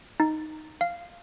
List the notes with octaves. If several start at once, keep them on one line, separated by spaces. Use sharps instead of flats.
D#4
F5